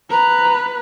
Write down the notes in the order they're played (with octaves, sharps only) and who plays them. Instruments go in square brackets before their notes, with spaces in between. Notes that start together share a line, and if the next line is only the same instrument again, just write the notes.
[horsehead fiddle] B4 [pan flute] A#5